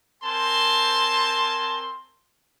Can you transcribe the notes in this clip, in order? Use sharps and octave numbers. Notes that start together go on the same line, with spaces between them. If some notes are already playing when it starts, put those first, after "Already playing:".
C4 A#4 C5 G#5 A5 C6